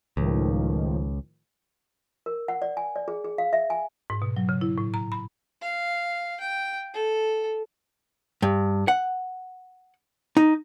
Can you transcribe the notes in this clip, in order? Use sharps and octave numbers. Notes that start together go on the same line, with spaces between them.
C#2 A2 D#3 F3
A#4
F#5
D5
G#5
D5
G#4
G#4
F5
E5
G#5
G#2
B2
F#3
C#3
E4
A2
A#5
B5
F5
G5
A4
G2
F#5
D#4